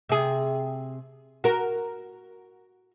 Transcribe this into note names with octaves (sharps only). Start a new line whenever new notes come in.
C3 G#4
F#4 A#4